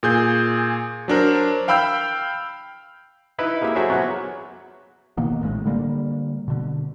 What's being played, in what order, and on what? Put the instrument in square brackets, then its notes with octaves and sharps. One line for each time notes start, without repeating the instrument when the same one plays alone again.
[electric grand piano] A#2 G#4 G6
F#3 D4 A#4 C5
F5 G5 B5 E6 F6 G6
[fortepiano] D#4 E4 B4
G#3 A#3 E4 G4 E5
F#3 F#4 G#4 A4 C5 E5
A#1 F#3 B3 F#4
[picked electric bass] B2 D#3 A#3 B3
A#1 A2 F3 G#3
D3 G3 G#3 A#3
B2 D3